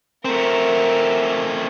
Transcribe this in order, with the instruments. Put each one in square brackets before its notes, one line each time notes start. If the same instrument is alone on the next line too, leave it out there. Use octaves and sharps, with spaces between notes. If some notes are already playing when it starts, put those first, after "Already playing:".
[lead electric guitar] A3 C4 [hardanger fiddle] A#4 E5